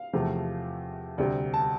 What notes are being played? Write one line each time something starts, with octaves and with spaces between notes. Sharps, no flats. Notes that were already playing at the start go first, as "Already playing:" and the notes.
Already playing: F5
E2 C3 F3 A3
D2 C3 G3 D5
A5